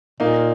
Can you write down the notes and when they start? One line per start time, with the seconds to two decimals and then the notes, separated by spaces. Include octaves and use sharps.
0.20 A#2 A#3 D#4